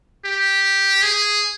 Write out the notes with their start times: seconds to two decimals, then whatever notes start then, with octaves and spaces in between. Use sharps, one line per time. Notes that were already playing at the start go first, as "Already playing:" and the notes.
0.25 G4
1.02 G#4